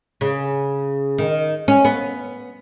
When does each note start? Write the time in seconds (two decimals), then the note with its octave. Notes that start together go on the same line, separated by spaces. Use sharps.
0.21 C#3
1.18 D#3
1.68 C#4
1.85 B3